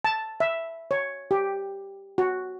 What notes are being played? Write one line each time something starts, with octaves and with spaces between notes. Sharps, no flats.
A5
E5
C#5
G4
F#4